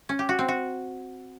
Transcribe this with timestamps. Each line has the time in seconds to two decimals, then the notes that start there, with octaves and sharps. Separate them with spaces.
0.09 C#4
0.19 G4
0.29 F#4
0.39 C4
0.48 F#4